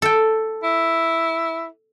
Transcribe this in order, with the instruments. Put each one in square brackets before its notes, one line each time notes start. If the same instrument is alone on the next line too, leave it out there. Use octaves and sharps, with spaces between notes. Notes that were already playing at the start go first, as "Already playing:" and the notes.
[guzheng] A4 G5
[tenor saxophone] E4